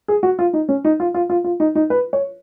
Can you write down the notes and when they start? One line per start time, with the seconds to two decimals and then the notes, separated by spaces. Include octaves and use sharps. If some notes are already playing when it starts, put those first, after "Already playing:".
0.08 G#4
0.23 F#4
0.39 F4
0.53 D#4
0.69 C#4
0.85 D#4
1.00 F4
1.14 F4
1.30 F4
1.44 F4
1.60 D#4
1.75 D#4
1.90 B4
2.13 C#5